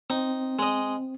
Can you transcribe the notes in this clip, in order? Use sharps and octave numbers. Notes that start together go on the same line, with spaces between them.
C4 D#4
G#3 D#5